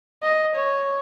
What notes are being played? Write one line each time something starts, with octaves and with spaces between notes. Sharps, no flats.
D#5
C#5